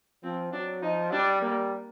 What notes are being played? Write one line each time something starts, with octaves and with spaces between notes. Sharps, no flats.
F3 C4
F#3 D4
F3 D#4
G3 D4
G3 A#3